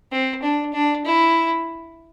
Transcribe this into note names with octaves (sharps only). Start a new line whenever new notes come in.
C4
D4
D4
E4